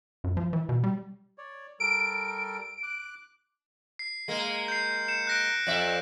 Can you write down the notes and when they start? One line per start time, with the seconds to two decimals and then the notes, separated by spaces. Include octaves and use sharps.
0.24 F#2
0.37 F3
0.53 E3
0.69 B2
0.84 G3
1.38 C#5 D5
1.80 G3 A4 A#4 D7
2.83 D6 F#6
3.99 C7
4.28 G#3 A#3
4.68 G6 C7
5.08 G6 C#7 E7
5.27 F#6 A#6 D7
5.67 F2 D5 E5